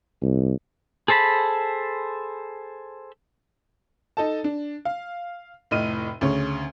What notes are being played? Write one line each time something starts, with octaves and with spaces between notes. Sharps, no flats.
C2
G#4 A4 C5 A5 B5
D#4 A4 A5
D4
F5
F1 A2 D#5 F6 D#7
D2 C#3 C#5